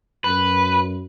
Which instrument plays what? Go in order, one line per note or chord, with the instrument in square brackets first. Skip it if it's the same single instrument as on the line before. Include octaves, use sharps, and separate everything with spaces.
[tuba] F#2 [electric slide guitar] B4